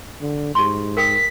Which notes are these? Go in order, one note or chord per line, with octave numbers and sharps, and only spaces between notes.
D3
G#2 G4 C6
A#4 G5 D#6 B6